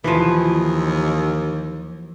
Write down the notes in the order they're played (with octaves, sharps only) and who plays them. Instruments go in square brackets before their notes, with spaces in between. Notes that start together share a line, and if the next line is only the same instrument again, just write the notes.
[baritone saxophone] D#2 [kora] E3 F3